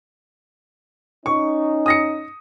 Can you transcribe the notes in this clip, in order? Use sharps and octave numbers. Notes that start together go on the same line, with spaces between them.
C#4 D#4 C#6
D#6 A#6 C#7